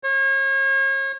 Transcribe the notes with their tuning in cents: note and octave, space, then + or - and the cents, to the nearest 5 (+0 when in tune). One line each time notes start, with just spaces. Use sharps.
C#5 -35